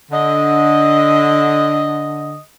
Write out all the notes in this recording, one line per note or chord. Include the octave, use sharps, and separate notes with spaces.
D3 D#5